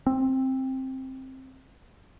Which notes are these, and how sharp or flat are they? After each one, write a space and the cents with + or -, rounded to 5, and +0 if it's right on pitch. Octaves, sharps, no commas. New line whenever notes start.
C4 +10